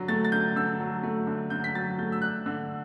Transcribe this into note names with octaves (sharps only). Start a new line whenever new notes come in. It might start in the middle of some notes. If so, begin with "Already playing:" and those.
Already playing: D3 F#3
A3 A6
A6
D3 G6
D3 E6
F#3
A3
D3
D3 G6
B6
F#3 A6
A3 G6
E6
D4 F#6
D3